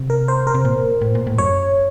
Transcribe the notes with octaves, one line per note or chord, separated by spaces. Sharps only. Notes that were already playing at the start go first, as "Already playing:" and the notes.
Already playing: C3
A#4
C5
A#4
C3
A#2
A2
A#2
A2
F#2 C#5